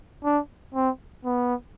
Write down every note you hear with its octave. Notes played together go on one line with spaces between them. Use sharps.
D4
C4
B3